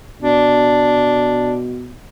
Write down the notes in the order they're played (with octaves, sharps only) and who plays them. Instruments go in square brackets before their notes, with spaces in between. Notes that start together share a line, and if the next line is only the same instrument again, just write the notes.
[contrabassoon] B2 [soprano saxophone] D4